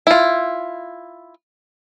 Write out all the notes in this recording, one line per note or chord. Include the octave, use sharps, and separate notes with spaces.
E4 F4